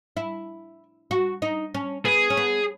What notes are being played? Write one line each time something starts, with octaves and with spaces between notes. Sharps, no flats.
E4
F#4
D#4
C#4
B3 G#4
C#4
B3